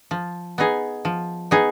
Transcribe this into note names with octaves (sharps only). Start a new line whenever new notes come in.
F3
B3 D#4 G#4
F3
B3 D#4 G#4